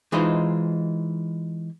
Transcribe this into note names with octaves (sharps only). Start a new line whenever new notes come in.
E3 G#3 D#4 F4 C5